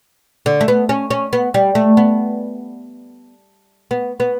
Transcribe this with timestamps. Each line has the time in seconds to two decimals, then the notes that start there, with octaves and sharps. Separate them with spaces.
0.46 D3
0.61 A3
0.68 B3
0.89 C#4
1.10 C#4
1.33 B3
1.54 G3
1.75 A3
1.97 B3
3.91 B3
4.20 B3